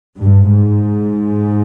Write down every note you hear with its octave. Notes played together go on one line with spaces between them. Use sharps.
G2
G#2